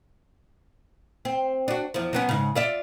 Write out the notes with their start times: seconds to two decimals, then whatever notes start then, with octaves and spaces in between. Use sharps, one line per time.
1.25 C4
1.68 D4 F#4
1.94 E2 F3
2.13 F#3 B3 C#4
2.29 G#2 C#3
2.55 F4 D5 E5